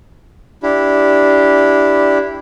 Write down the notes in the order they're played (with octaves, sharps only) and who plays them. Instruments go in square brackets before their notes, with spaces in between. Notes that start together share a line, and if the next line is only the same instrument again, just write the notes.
[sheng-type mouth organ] D4 E4 G4